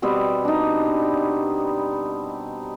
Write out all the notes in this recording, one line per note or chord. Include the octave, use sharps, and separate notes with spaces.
B2 G3 B3 C4
D4 D#4